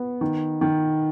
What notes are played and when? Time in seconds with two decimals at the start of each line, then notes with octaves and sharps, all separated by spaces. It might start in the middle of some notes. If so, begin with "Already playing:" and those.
Already playing: B3
0.21 D#3
0.61 D#3